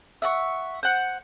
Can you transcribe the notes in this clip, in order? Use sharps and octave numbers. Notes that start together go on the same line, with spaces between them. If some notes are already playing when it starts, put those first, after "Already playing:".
E5 F#5 C#6
C5 F#5